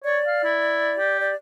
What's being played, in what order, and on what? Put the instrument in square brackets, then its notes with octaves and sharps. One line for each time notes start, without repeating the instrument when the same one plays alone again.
[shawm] C#5 [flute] D5
[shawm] F5
E4
G4
[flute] D5